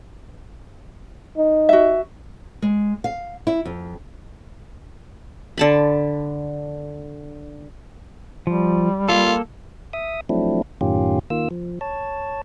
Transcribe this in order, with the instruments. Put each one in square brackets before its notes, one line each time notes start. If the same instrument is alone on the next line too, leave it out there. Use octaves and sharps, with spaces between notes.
[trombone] D#4
[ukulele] F#4 E5
[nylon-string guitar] G#3
F5
E4
F2
[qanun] D3 A5 B5
[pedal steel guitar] F3 [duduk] G3
[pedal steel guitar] A#3 A4 [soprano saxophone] F4
[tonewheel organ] E5 D#6
F3 F#3 A3 C4 D4 E4
F#2 A2 D#3 C#4 F4 G4
D#3 A#3 F4 E6
F3
C#5 A5